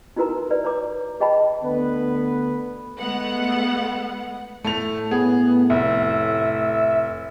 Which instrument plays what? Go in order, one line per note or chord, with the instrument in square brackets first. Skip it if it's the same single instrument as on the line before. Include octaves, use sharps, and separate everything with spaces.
[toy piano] D#4 E4 F#4 A#4 B4 A#5
B4 D5
C#5 A#5 D6
G#4 D#5 G5 A5 B5
[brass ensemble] D2 D3 B3 B4
[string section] G#3 A3 B3 F#5
[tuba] A2 [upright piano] A3 F7
[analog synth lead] B3 [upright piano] G#4
[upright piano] F1 [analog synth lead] E5